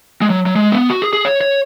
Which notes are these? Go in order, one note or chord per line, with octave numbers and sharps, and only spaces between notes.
G#3
F#3
F#3
G#3
B3
F#4
G#4
G#4
C#5
C#5